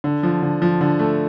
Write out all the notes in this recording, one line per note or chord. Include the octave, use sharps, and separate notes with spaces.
D3
F3
D3
F3
D3
A3